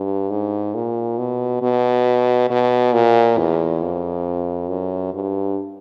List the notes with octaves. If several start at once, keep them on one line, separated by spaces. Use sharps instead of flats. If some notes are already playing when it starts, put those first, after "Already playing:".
Already playing: G2
G#2
A#2
B2
B2
B2
A#2
E2
F2
F#2
G2